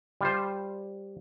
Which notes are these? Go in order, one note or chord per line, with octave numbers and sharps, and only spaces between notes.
G3 F4 C5